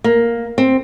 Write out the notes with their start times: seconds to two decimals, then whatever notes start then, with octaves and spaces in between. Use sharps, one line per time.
0.04 A#3
0.58 C4